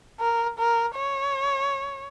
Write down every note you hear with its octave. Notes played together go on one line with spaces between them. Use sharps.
A#4
A#4
C#5